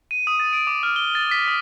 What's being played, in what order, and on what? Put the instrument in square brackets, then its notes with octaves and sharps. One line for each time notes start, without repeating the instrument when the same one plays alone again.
[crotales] D#7
D#6
A6
D7
D6
F6
G7
A6
B6
D#6